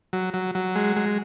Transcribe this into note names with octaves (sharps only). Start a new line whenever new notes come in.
F#3
F#3
F#3
G#3
G#3